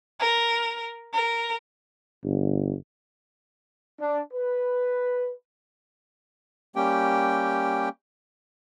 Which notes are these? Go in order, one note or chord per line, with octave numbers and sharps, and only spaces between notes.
A#4
A#4
G1
D4
B4
G3 A#3 C#4 G4 G5